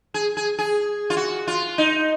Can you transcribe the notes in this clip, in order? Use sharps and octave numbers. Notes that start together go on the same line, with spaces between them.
G#4
G#4
G#4
F4
F#4
F4
D#4